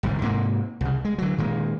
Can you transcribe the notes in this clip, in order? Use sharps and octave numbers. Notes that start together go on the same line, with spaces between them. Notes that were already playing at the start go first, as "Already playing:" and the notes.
G1 C2 G#2
G#2 C3 A#3
C2 C#3
G#3
D3 F#3
A#2 D#3 G#3